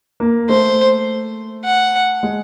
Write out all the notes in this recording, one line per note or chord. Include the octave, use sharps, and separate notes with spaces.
A#3
A3 C5
F#5
G#3